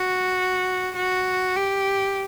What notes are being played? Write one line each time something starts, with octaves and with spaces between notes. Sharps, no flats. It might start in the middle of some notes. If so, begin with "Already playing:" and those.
Already playing: F#4
F#4
G4